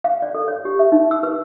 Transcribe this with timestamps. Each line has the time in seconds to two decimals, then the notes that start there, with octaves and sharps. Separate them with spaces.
0.04 F5
0.22 D5
0.35 A4
0.48 C#5
0.65 G4
0.79 E5
0.92 D#4
1.11 E6
1.23 B4